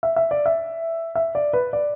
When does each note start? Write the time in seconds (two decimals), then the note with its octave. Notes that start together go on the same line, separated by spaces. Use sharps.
0.03 E5
0.16 E5
0.31 D5
0.46 E5
1.15 E5
1.35 D5
1.53 B4
1.73 D5